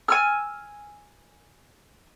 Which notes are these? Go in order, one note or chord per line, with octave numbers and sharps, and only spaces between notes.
G#5 E6 F6